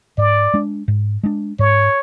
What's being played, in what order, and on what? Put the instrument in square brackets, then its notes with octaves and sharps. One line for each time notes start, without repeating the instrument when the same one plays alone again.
[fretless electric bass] G#2 [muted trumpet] D5
[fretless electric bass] G#3 D4
G#2
G#3 D4
[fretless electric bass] G#2 [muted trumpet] C#5